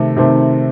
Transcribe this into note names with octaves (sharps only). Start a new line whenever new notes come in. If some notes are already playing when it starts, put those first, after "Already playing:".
Already playing: C3 D#3 A3 C4
C3 D#3 A3 C4